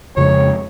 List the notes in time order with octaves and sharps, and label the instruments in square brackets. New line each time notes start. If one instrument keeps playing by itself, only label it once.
[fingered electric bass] F2 C#3 F3 G#3 [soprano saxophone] C#5